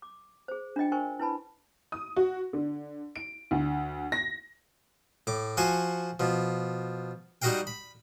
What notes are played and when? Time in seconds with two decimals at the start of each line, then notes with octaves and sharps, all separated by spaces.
0.02 D6
0.48 G#4 C5
0.76 D4 F4 D#5 G5
0.92 A#4 C5 G5 G#5 C#6
1.19 E4 B4 A5 B5
1.92 D#6
2.16 F#4
2.53 D3
3.16 D7
3.51 D2
4.12 A#6
5.27 A2 D6
5.57 F3 F#4 G#5 C6 C#6
6.20 B2 F3
7.42 G3 D#4 F#4 D#5 F5 G5
7.67 B5